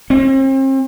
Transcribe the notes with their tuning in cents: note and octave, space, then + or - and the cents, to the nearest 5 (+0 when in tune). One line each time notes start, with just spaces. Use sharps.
C4 +40